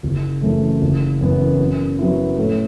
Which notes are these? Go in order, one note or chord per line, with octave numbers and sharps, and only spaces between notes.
F#1
F#2 E3 A3
F#1
F#2 E3 B3
F#2
F#3 B3 E4
A2